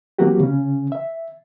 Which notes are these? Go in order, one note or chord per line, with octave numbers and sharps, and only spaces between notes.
E3 F#3 A#3 C4 F#4 G4
C#3 C#4
E5